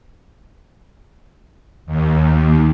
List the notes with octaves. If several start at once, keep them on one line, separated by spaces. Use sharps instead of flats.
D#2